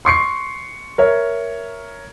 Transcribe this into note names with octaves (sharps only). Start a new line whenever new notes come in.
C6 C#6 C7 C#7
A#4 C#5 E5